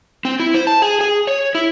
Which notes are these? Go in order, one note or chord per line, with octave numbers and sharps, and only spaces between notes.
C4
E4
C5
A5
G#4
G#4
C#5
E4